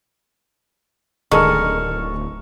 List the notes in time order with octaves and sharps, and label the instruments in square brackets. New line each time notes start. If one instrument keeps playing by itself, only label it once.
[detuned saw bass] D1 [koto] D#3 [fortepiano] G#3 D4 A4 [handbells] C#6 F6